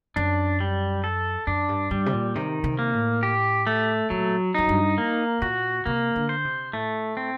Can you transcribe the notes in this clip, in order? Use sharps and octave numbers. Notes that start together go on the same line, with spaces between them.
F#2 D4
G3
A4
F#2 D4
G2
G2 G3
C3
A#2
C3 D#3
C3
A#3
A2
G4
A3
A#2 F#3
F#2 D#4
G2
A#3
A#2 F#4
C3 A#3
D3
C5
C3
A2 A3
C4